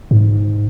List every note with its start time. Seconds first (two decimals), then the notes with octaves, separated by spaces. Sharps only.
0.11 G#2